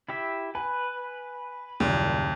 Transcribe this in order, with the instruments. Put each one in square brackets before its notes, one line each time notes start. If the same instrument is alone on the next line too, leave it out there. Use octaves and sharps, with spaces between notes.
[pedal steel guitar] E4 G4 E5
[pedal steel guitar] B4 [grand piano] G#5
[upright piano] F#1 [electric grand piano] D#2 [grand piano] A#2 G3